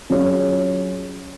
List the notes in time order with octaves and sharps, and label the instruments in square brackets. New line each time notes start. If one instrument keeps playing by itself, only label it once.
[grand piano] F#3 C#4 F4 G#4 C#5